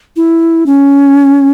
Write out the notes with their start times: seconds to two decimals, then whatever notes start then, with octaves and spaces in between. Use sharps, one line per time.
0.16 E4
0.66 C#4